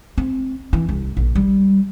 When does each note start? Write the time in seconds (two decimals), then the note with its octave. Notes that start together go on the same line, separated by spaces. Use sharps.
0.18 C4
0.73 E3
0.89 C2
1.17 A#1
1.35 G3